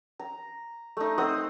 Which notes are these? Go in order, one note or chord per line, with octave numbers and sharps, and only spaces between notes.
A#5
A3 D#4
C4 C5 F#5 D#6